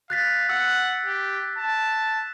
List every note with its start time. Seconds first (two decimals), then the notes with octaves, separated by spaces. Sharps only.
0.10 F5 F#6 A6 B6
0.49 F#5 E6 F#6
1.05 G4
1.58 A5